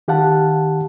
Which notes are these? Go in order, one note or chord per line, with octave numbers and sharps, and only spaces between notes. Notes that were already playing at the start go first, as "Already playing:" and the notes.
D#3 G4 F5 F#5 A5